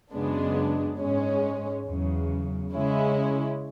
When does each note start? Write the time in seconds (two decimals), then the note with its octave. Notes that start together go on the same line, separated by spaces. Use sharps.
0.13 F#2 C#3 G#3 B3 D4
1.00 G#2 G#3 C#4
1.87 E2 C#3 F#3
2.74 C#3 G#3 C#4 E4